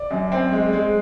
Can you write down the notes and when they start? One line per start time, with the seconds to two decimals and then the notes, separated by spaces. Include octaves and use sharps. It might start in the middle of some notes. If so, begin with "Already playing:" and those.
Already playing: D5
0.11 F#2
0.32 C4
0.52 G#3
0.73 G#3